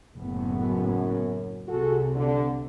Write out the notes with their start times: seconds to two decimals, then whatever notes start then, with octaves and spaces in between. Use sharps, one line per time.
0.17 F#1 A2 B3
0.58 F#2
1.69 C2 C3 F#4 G#4 A4
2.15 D3